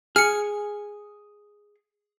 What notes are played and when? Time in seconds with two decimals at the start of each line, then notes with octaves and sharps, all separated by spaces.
0.16 G#4 F6 C#7